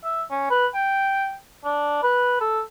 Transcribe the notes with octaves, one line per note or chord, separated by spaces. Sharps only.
E5
C#4
B4
G5
D4
B4
A4